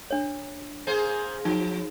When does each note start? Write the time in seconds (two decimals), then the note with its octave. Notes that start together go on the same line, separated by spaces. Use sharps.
0.11 D4 C#5
0.87 A#3 G#4 C5
1.45 F3 D#4